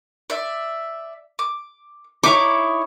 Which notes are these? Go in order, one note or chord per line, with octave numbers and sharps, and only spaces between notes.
D5 E5
D6
D#4 E4 C#5 D6